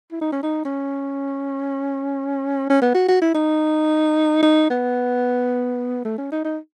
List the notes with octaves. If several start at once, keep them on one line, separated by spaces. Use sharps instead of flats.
E4
D#4
C#4
D#4
C#4
C#4
B3
F#4
F#4
E4
D#4
D#4
B3
A3
C#4
D#4
D#4